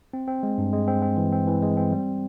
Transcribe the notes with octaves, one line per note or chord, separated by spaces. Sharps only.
C4
C4
G#3
G2
G#3
C4
C4
E3
C4
E3
G#3
C4
G3